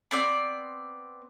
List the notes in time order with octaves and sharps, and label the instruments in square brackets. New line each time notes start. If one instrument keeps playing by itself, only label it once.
[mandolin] B3 C4 D5